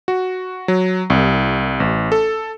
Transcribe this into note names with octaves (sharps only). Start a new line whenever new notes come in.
F#4
F#3
C2
A1
A4